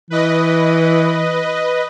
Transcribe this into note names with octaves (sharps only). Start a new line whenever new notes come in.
E3 B4 D#5